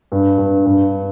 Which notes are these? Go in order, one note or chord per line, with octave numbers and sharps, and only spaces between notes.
G2
G2
G2